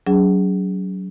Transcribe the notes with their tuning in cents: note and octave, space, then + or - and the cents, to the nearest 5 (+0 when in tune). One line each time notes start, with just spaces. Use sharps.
F#3 +20 C#4 +45 G#4 -10